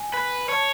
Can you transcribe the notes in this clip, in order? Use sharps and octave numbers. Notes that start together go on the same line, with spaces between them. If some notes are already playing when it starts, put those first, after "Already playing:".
Already playing: G#5
B4
C#5 A5